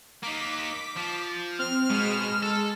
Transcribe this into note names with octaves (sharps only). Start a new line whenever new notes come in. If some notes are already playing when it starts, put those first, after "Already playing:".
A#3 D#4 D6 B6
F3
C4 F6
B2 G#3 E7
A4